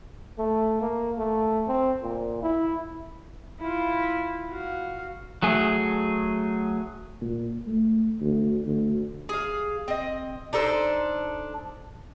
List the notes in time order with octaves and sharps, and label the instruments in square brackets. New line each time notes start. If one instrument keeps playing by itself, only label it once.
[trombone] A3
A#3
A3
C4
A#2
E4
[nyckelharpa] E4 F4
F#4 F5
[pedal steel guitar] F#3 A3 G#4
[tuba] A#2
A3
D2
D2
[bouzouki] G#4 F5
C4 D#5
D4 D#4 A4 C5